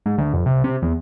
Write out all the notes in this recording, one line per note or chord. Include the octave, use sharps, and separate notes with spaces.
G#2
D2
F1
C2
C3
E2